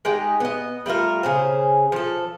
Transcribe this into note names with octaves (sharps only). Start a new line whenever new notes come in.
G#3 D#4 G4
B3 D#5
G3 A3 F4 A#4
C#3 G#4 C5
F3 A4